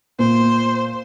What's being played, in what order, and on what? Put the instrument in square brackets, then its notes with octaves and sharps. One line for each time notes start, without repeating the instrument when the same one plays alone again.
[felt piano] A#2 [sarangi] C5